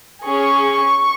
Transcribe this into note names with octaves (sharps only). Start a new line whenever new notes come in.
C#4 G#4 C#6